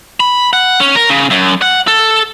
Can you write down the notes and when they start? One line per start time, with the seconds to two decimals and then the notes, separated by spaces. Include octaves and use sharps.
0.20 B5
0.53 F#5
0.80 C#4
0.96 A#4
1.09 C#3
1.30 F#2
1.62 F#5
1.88 A4